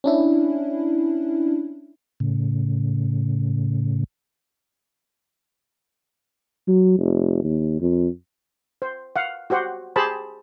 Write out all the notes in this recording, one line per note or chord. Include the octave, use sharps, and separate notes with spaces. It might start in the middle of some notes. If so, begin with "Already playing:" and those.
C#4 D4 E4
A2 C#3
F#3
F1
D#2
F2
C5
F5 F#5
F#4 G4 C5 F#5
G4 G#4 C5 A5 B5